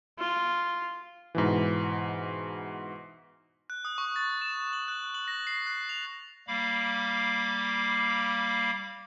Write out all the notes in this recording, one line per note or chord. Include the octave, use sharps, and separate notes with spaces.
F4
G#2 B2 E3
F#6
D#6
C#6
A6
E7
F#7
F#6
F#7
A#6
C7
F#6
F7
G3 A#3 F5 B5 D6